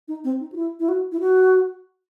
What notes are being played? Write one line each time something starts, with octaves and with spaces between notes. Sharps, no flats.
D#4
C4
D#4
F#4
E4
E4
F#4
E4
F#4